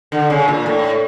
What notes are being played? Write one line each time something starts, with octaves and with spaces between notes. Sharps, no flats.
D3
C#3
A#2
A2